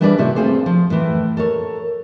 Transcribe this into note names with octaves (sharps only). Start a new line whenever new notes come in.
E3 G3 D4 G#4 B4 D5
A2 C3 E4 F#4 G#4
C4 F4 G#4 A4 C5
F3
A2 E3
A4 A#4 C#5